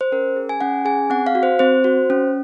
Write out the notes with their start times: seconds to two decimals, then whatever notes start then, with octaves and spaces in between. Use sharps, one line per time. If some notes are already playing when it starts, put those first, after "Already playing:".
0.01 C5
0.12 C#4 A#4
0.36 G#4
0.49 G#5
0.61 C#4 F#5
0.85 G#4 G#5
1.10 C4 F#5
1.27 F5
1.35 F#4
1.43 C5
1.59 C4 C5
1.84 F#4
2.10 C#4